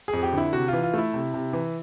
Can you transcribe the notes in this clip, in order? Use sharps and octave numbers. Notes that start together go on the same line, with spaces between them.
G#4
F2
G4
D3 E4
C3 F#4
E3 F4
F4
A3 E4
C3
C3
E3